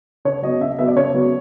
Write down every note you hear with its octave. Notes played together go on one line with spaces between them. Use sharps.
C#3 C#5
F#3 B3 D#5
C#3 E5
F#3 B3 E5
D5
C#3 C#5
F#3 B3